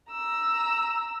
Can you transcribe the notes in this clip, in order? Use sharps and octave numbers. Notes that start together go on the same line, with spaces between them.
A#5 E6